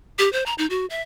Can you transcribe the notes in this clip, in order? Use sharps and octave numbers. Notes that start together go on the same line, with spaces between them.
G4
C5
A#5
D#4
F#4
E5